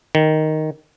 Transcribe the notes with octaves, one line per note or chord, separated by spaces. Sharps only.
D#3